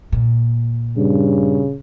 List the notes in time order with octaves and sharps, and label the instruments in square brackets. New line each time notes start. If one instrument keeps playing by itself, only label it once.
[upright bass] A#2
[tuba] G2 [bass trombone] C#3